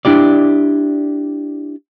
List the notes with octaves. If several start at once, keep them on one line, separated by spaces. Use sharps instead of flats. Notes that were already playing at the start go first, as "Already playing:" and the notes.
D4 E4 G4 D5